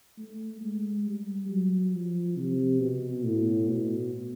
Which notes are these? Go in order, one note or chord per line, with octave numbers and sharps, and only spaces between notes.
A3
G#3
G3
F#3
F3
C3
B2
A2
B2